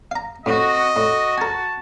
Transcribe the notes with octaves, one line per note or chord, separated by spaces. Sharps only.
F5 A#5
A2 C4 F#4 D#5
A2 F#4
A#4 G#5 A5